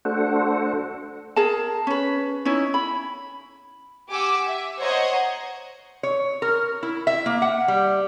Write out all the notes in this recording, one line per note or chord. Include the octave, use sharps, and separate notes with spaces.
A3 D4 F#4 A4 C5 F#5
G#4 A#4 A5
C#4 B4
C#4 D#4 E4
B5
G4 F#5 G#5 D6 E6
E5
C5 C#5 D#5 F#5 A#5 G#6
C#5
A#4
E4
E5
A#3
F#5
G3